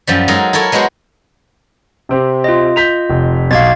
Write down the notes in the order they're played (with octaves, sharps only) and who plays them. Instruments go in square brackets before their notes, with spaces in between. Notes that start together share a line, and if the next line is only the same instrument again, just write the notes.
[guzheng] F#2 F3 G3
F#3 G#3 D#4 A4 A#4
E4 A4 A#4 C#5
F#3 G#3 B3 F#4 C5
[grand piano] C3 C4 G4
[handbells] F4 D#5
[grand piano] G6 B6 F7
F1
[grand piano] B1 [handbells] F5 G#6 A6